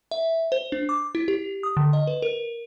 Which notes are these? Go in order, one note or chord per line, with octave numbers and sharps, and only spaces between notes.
E5
C5
D4
D6
E4
G4
D#6
D3
D#5
B4
A#4